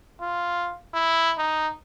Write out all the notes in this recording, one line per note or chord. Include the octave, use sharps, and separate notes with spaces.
F4
E4
D#4